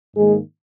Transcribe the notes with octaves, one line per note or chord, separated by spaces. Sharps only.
G#2 D#3 G#3 A#3 G#4